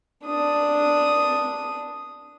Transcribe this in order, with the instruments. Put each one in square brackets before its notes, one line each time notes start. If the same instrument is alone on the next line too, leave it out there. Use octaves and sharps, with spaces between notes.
[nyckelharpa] D4 D#6